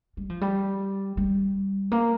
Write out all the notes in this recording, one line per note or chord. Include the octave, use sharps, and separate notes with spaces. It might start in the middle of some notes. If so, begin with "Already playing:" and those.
G3
F3
G3
G3
A#3